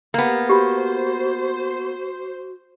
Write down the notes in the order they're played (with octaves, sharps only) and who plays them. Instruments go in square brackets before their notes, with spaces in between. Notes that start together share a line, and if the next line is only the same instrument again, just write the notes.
[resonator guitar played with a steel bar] A#3 B3 [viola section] G4
[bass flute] F#4 [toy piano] G4 B5 [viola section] C5